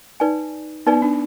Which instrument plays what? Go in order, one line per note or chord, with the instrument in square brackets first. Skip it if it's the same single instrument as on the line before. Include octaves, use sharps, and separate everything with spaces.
[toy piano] D#4 B4 D5 G#5
[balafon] B3 [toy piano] D#4 B4 D5 G#5
[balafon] D4